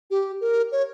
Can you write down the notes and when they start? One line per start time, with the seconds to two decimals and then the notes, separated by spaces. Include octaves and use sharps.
0.11 G4
0.41 A#4
0.72 C#5